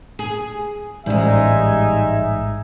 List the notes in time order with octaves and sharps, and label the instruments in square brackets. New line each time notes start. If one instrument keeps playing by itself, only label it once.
[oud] G#4
[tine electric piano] A1 G#2 [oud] G3 G#3 [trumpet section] D#4 E5 G#5